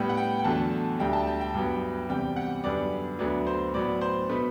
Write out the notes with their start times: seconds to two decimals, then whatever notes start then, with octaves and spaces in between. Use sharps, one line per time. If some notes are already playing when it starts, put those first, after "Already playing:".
Already playing: A2 G3 B3 G5
0.09 F#5
0.17 G5
0.39 G5
0.44 E2 D3 F#3 A3 A5
0.99 D2 D3 G3 G5
1.13 A5
1.27 G5
1.41 G5
1.54 G2 F#3 B3
2.09 E2 C3 G3 G5
2.36 F#5
2.64 F#2 D3 G3 B3 D5
3.19 D2 D3 F#3 B3 D5
3.47 C5
3.74 A2 F#3 B3 D5
4.01 C5
4.29 B2 A3 B4